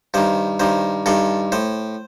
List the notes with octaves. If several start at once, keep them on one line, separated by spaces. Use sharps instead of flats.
G2 D#3 C5
G2 D#3 C5
G2 D#3 A4
A2 C5